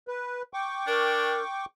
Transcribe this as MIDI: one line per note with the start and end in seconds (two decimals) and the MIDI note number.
0.08 0.42 71
0.54 1.66 79
0.54 1.66 85
0.54 1.66 86
0.87 1.39 62
0.87 1.42 70